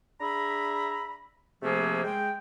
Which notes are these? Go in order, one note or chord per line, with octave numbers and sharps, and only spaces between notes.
D4 G#4 E5 A#5 B5
C3 F3 A3 A#3 G#4
G#3 G5